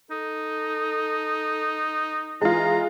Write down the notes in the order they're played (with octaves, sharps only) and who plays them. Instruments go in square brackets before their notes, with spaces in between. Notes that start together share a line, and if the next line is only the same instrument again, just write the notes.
[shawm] D#4 [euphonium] A4
[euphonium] E3 [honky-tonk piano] G#3 F4 [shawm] A#5